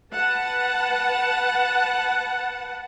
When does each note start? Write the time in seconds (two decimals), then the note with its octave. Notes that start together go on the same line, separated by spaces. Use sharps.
0.12 B4 F#5 A5